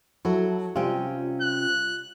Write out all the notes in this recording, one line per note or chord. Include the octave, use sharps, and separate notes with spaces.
F#3 E4 F#4 A4
C3 G3 C#4 F4 G5
F#6